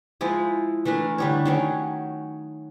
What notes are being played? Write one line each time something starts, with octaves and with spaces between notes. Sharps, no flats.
F3 G#3 E4
E3 A3 D4 A#4
D3 G3 C#5
D#3 F#3 C#4